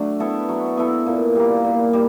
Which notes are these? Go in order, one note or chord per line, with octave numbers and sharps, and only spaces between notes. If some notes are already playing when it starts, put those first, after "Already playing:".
Already playing: F#3 A3 D4
B3 E4 A4
F#3
B3 E4 A4
A#2
G3 A#3
A#2
G3